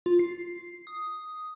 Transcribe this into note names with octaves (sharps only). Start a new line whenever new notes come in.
F4
C7
D#6